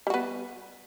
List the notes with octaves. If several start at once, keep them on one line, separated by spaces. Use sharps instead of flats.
G3 B3 F#4